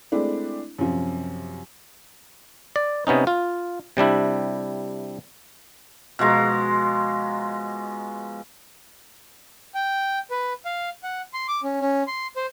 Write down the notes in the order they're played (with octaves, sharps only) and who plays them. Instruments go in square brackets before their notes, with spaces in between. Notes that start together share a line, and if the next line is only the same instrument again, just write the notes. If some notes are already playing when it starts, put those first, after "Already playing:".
[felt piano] G#3 A3 C4 D4 E4
F#2 C3 F3
[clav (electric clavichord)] D5
C3 B3 C#4 D#4
F4
C3 G3 D4 E4
[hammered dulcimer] B2 F3 G#3 A#5
[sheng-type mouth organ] G5
B4
F5
F#5
C6
D6
C#4
C#4
C6
C5